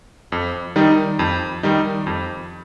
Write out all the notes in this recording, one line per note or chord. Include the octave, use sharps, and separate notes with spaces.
F2
D#3 G3 D#4
F2
D#3 G3 D#4
F2